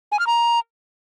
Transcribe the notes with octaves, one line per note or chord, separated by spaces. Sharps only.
G#5
F6
A#5